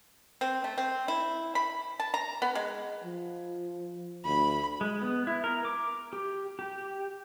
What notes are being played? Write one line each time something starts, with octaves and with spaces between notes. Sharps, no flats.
C4
A3
C4
E4
B5
A5
A#5
B3
G#3
F3
D2 B5
G#3
B3
E4
A#4
D6
G4
G4